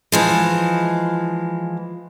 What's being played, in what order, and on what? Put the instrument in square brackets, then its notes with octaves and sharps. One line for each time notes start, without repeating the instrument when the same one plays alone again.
[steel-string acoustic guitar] E3 F3 G#3